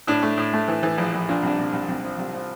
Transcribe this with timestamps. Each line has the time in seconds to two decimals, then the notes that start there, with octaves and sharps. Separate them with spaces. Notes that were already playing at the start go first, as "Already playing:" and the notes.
0.07 A2 D4
0.23 A3
0.38 A2
0.53 A3
0.68 E3
0.83 E3
0.98 A#1
1.13 A#1
1.29 A#2 D4
1.43 C2 D4
1.59 C2
1.73 C2
1.88 C2
2.03 F3
2.18 C2
2.33 F3